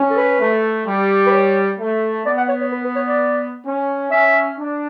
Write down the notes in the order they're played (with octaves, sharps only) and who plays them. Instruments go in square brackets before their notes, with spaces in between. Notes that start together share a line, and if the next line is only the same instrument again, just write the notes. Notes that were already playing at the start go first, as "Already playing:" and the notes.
Already playing: [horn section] C#4
[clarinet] A4
B4
[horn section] A3
G3
[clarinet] B4
C#5
[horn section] A3
[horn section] B3 [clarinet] D5
[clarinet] F#5
C#5
C#5
B4
B4
C#5
D5
[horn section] C#4
[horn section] C#4 [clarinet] E5
[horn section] D4